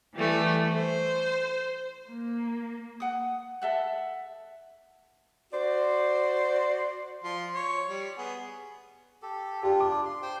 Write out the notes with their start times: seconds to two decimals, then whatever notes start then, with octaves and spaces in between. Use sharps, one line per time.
0.14 E3 G3 A3
0.73 C5
2.09 A#3
3.00 F#5 D#6
3.62 A4 E5 F#5
5.53 F#4 C5 D5
7.24 F3 C6
7.55 C#5
7.89 G3
8.18 B3 G#4
9.22 G4 A4
9.63 D4 F4 G4
9.80 D6
10.05 C6
10.22 C5 G5 C6